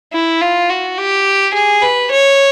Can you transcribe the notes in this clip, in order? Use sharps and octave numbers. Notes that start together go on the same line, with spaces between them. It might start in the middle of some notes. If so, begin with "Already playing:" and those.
E4
F4
F#4
G4
G#4
B4
C#5